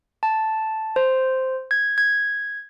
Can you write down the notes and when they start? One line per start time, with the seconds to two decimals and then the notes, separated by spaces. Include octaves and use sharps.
0.23 A5
0.96 C5
1.71 G#6
1.98 G#6